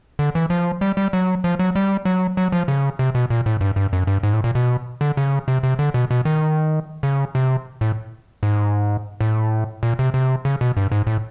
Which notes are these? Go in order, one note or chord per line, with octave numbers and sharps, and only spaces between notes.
D3
E3
F3
G3
G3
F#3
F3
F#3
G3
F#3
F#3
F3
C#3
C3
B2
A#2
A2
G2
G2
F#2
G2
G#2
A2
A#2
B2
D3
C#3
C3
C3
D3
B2
B2
D#3
C#3
C3
A2
G#2
A2
A#2
C3
C3
C#3
B2
G2
G#2
A2